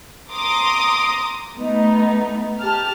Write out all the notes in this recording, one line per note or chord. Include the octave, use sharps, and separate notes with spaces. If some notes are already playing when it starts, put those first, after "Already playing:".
A#5 C6 D6 D#6
A3 B3 D#4
G4 A5 F6